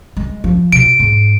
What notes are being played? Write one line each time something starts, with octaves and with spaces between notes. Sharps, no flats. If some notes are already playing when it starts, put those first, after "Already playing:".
G#3
F3
B2 D7
G#2